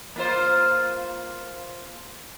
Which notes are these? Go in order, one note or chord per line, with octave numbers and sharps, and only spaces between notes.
A#3 F4 C5